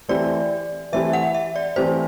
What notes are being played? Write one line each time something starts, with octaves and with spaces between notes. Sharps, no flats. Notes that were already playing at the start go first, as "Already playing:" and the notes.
E3 A3 C4 E4 G4 D5
E3 A3 C4 E4 G4 E5
F#5
E5
D5
E3 A3 C4 E4 G4 C5